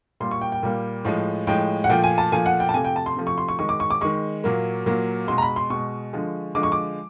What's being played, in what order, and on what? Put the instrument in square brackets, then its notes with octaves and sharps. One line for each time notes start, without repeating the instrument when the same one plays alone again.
[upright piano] A#2 G3 A#3 C6
C#6
G5
G5
A#2 G3 A#3
A2 F3 G#3
A2 F3 G#3 G5
F#5
A#2 F3 A3 G5
G#5
A5
A#2 F3 A3 G#5
F#5
G5
A5
C3 F3 A3 G#5
G5
A5
C6
C3 F3 A3
C#6
C6
C#6
D#3 G#3 C#6
D6
C#6
D6
D#3 G#3 C#6
A#2 F#3 A#3
A#2 F#3 A#3
B2 G#3 C6
A#5
B5
C6
B2 G#3 C#6
D3 F3 G#3
D3 F3 G#3 D6
C#6
D6